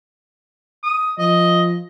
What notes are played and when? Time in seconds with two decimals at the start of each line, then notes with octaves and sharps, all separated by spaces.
0.83 D#6
1.19 F3 D#5